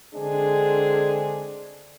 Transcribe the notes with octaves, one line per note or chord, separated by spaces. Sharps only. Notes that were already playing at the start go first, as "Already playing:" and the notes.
D3 G#3 C4 D4 G#4